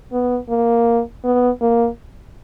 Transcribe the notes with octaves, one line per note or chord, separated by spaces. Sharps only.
B3
A#3
B3
A#3